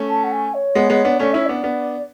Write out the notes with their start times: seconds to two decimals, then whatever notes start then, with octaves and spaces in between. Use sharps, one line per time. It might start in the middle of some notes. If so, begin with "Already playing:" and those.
Already playing: A3 C#4
0.09 A5
0.23 F#5
0.32 G#5
0.54 C#5
0.75 G#3 B3
0.90 G#3 B3
1.05 B3 D4
1.19 A3 C#4 D5
1.33 C#4 E4 E5
1.45 B3 D4 D5
1.63 B3 D4